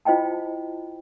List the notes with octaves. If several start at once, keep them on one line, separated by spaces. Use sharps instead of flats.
E4 F4 C5 D#5 G5 A5